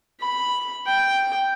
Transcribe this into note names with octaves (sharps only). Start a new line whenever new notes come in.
B5
G5